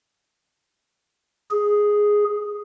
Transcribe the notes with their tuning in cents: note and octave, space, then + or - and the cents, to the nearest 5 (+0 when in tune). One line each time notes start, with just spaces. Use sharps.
G#4 +0